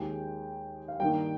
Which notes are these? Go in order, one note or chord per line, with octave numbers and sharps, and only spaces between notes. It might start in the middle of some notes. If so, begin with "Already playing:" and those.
Already playing: D#2 D#3 G#3 G5
F5
G2 D#3 A#3 G5